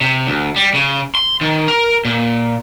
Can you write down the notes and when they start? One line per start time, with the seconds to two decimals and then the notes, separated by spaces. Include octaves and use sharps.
0.01 C3
0.27 D2
0.56 G3
0.74 C#3
1.15 C6
1.41 D#3
1.68 A#4
2.05 A#2